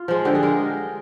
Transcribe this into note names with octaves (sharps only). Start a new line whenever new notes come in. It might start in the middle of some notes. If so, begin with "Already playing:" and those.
Already playing: F4
F3 G#3
D3 G4
G#4
G#3 A#4